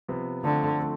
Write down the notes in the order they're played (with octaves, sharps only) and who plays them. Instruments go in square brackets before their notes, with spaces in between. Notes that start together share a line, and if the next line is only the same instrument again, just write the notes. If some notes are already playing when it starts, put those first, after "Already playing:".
[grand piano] C3 F3 B3
[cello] D3 [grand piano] F3 A3 C4 F4
[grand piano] F3 A3 C4